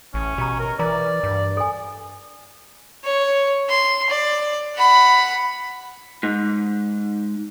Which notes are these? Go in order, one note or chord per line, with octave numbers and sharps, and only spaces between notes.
A1 C#4
B2 G4 A#5
A#4
E3 A#4 D5 A#5
G2
A4 G#5
C#5
C6
D5
F#5 B5
G#2